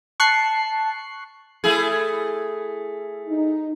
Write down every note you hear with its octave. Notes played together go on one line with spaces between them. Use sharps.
A5 C#6 F#6 C7
A3 E4 G#4
D#4